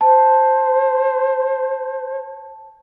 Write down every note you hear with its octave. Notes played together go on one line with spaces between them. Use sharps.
C5 A5